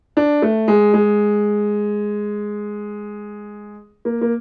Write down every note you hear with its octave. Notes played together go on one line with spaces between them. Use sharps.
D4
A3
G#3
G#3
A#3
A#3